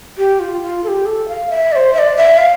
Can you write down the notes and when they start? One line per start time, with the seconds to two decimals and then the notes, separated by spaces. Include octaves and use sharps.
0.18 G4
0.40 F4
0.62 F4
0.84 A4
0.88 G4
1.06 A4
1.28 F5
1.50 E5
1.72 D5
1.76 C5
1.94 E5
1.99 D5
2.16 E5
2.38 F5